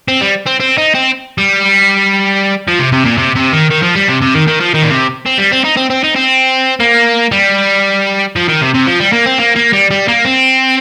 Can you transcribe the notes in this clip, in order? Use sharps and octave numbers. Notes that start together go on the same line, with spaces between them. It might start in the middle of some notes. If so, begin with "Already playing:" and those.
C4
G3
C4
C4
D#4
C4
G3
F3
C3
C3
A#2
C3
C3
D#3
D#3
F3
G3
C3
C3
D#3
D#3
F3
D#3
A#2
C3
C4
G3
C4
D#4
C4
C4
D#4
C4
A#3
G3
F3
D#3
C3
C3
F3
G3
A#3
C4
A#3
A#3
G3
G3
A#3
C4